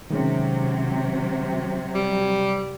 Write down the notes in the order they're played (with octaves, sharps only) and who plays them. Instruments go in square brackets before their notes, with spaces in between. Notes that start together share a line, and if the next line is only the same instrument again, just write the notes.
[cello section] C3 F#3 [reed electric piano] D#3 G#3 C#4
[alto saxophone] G3